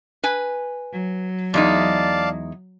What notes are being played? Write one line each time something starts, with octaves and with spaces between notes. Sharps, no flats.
B4 G#5
F#3
E2 G#3 D#4 D5 F5 A5